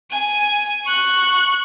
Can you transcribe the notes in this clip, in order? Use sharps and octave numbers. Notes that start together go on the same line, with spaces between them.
G#5
C#6 F#6